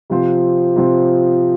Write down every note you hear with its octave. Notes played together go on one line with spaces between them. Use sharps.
C3 F3 C4 F4 C5
C3 F3 C4 F4 C5